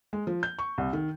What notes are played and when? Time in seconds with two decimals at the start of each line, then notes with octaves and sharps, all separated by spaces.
0.13 G#3
0.27 F3
0.43 G6
0.59 C#6
0.78 C2
0.93 D#3